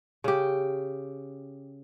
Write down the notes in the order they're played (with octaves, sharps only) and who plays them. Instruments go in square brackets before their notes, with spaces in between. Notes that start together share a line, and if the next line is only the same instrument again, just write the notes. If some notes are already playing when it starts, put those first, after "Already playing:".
[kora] C#3 G4